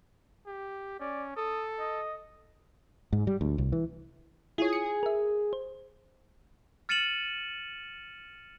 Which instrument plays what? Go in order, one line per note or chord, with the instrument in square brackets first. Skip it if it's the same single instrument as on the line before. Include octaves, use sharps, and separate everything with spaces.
[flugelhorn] G4
[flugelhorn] C#4 [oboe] D5
[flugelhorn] A4 [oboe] D#6
[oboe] D#5
[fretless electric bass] G#2
G3
D2
C2
E3
[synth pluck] E4 F4 C#5 [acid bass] G#4
[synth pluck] C#7
A#4 E5
C5
[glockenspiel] F6 A6 C#7 D#7 E7 F#7